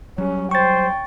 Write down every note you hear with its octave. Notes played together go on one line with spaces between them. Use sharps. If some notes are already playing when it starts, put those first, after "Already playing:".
F#3 G3 C#4
C5 G5 C#6 A6